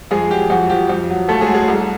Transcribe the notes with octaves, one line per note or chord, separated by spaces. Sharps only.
F2 G#3 G#4
F#3 G4
F2 F#4
F3 G4
F2
F#3
D#2 A3 A4
G#3 G#4
F#3
G#3 G#4
C2